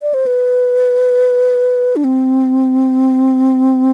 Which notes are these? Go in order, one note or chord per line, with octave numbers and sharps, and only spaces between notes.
D5
C5
B4
D4
C4